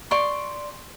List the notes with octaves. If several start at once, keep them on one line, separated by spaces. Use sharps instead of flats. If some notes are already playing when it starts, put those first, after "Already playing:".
D5 C6 C#6